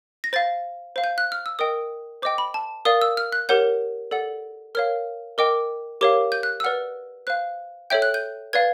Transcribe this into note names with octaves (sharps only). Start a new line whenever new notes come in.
A#6
C5 F5 A6
C5 F5
G6
F#6
F6
E6
A#4 D#5 G5 D#6
C5 D#5 G5 D6
B5
A5
A#4 D5 F5 D#6
E6
F6
F#6
G4 A#4 C#5 F#5 G6
A4 D5 F#5
A#4 C#5 F5 F6
A#4 D#5 G5 D6
G4 A#4 C#5 F5 D6
G6
F#6
E6
B4 D5 F#5 F6
C5 F5 F#6
A4 C#5 E5 G5 G6
F#6
G6
B4 D5 F5 G#6